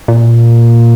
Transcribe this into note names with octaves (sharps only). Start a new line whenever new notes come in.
A#2